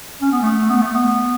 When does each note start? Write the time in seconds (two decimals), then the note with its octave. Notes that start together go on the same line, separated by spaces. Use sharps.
0.22 C#4
0.32 B3
0.42 A3
0.70 B3
0.82 A3
0.95 B3